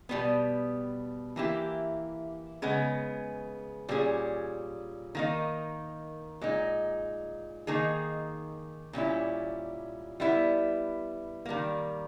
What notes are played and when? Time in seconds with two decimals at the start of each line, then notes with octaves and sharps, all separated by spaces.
0.09 B2 G3 B3
1.36 E3 A#3 E4 G4
2.62 C#3 G#3 B3
3.89 A#2 G3 C#4 E4 G#4
5.15 D#3 A#3 D#4
6.41 A#2 G#3 D#4
7.67 D#3 A#3 D#4 G#4
8.93 A#2 G3 C#4 E4
10.20 G3 B3 E4
11.46 D#3 G3 A#3